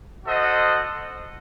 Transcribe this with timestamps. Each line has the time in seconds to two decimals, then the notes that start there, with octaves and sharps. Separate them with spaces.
0.25 F#4 A4 C5 D#5 F#5